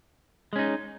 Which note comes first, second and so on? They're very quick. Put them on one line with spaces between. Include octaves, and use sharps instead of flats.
G#3 C#4 D#4